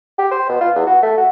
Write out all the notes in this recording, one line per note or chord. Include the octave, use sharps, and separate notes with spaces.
G4
C5
B2
F4
E2
F#4
A3
F#4